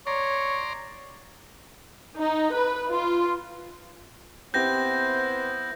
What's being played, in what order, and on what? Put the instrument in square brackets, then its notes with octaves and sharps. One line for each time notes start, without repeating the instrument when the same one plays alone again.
[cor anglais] C#5 [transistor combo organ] D5 A#5 C6
[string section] D#4
B4
F4
[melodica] B3 E4 [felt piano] C4 G4 [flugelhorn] C5 [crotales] G6 A#6